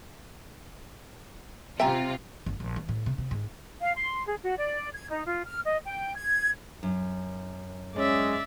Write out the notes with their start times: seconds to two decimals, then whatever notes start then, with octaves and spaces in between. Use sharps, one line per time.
1.80 C3 C4 F4 E5 G5 G#5 A#5
2.46 G1
2.60 A#1
2.76 E3
2.89 A2
3.06 C3
3.18 C3
3.31 G#2
3.79 F5
3.97 C6
4.26 G#4
4.43 F#4
4.57 D5
4.93 G#6
5.09 D#4
5.25 F4
5.46 F6
5.64 D#5
5.85 G5
6.15 G#6
6.83 F#2
7.96 G#3 C#4 D5 E5